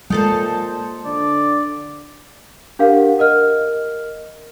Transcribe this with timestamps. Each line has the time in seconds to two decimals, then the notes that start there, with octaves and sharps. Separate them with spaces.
0.10 A#2 G#3 D#4 A4 C5
1.05 D3 D5
2.79 D4 G4 A#4 F5 F#5
3.19 A#4 D#5 F6